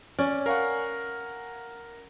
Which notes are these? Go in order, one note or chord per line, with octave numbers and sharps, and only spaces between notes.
C#4 D5
A#4 F5 F#5 G#5 C#6